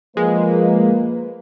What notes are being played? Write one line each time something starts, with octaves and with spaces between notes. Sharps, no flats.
F3 G#3 A#3 B4